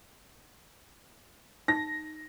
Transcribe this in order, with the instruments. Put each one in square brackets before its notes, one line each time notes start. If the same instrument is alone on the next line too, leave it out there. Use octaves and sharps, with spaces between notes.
[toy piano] D#4 [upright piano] A#6